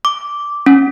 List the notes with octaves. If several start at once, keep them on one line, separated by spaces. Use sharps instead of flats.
D6
C#4